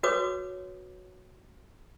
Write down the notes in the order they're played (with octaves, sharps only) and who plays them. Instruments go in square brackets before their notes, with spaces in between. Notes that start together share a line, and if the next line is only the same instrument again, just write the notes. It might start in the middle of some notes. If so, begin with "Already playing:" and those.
[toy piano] F#4 B4 C#5 D6 D#6